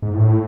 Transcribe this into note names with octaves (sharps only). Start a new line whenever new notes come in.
G#2
A2